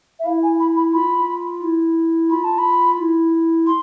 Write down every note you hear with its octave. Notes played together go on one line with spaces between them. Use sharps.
E5
E4 F5
G#5
B5
B5
F4 B5
E4
F4 B5
A5
B5
E4
C6